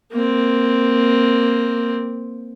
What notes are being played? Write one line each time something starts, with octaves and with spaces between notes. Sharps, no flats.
A#3 C4